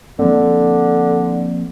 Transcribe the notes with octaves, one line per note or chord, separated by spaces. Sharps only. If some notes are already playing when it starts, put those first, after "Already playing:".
D3 F3 A#3 C4